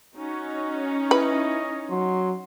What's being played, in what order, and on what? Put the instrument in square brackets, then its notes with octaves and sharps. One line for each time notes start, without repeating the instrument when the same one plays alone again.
[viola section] C#4 D#4 [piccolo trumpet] F#4
[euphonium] E4 [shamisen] B4 [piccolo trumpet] D#5
[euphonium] F#3 [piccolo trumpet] C6